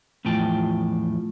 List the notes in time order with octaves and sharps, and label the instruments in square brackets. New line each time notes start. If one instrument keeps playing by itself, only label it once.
[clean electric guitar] E2 A2 F3 G5 A5